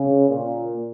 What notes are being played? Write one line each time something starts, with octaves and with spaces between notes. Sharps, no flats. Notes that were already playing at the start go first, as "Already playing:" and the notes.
Already playing: C#3
A#2